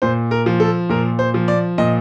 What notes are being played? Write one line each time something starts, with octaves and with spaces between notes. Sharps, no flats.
A#2 C5
A#4
F3
A4
A#2 A#4
C5
F3
D5
A#2 D#5